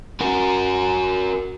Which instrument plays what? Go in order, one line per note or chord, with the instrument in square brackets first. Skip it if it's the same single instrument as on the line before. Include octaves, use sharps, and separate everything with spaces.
[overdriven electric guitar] F#4 A#4